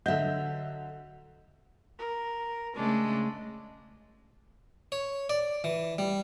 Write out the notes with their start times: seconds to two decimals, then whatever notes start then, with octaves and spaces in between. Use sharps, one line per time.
0.06 D3 F#3 D#5 E5 F#5 G6
1.99 A#4
2.76 C#3 G#3 A3 D4
4.92 C#5
5.30 D5
5.64 E3
5.98 G3